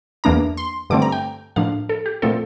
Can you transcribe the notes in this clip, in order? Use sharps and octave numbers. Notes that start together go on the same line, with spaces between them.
E2 E3 A#3 D4 A#5
C6
G2 D3 A3 C4 D6
A#5
G5
A2 F3 A#3 D4 F5
A4
G4
A#2 F3 A3 C4 A4